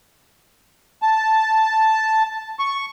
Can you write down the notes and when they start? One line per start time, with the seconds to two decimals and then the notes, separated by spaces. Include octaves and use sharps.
1.02 A5
2.59 C#6